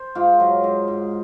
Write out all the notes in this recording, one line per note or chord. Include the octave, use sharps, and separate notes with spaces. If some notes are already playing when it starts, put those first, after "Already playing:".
Already playing: C5
G#2 F4
F#3
G#2
G#2